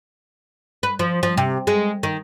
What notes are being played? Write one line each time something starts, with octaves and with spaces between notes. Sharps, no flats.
B4
F3
F3
C3
G#3
D#3